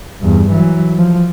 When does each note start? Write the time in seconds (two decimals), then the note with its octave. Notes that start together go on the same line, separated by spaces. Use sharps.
0.20 E2 G2
0.52 E3 F#3
0.98 F3